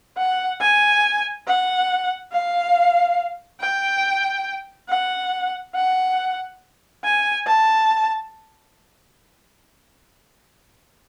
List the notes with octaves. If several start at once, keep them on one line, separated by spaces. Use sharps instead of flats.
F#5
G#5
F#5
F5
G5
F#5
F#5
G#5
A5